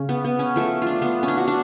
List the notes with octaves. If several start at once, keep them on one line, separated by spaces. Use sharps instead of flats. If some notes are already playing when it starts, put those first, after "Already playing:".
Already playing: C#3 C#4
B3
B3
C#4
F3 A3
D4 F4
B3
C#4
D4
F#4
D4